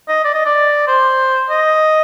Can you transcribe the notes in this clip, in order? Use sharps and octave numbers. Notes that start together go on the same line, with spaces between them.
D#5
D5
D#5
D5
C5
D#5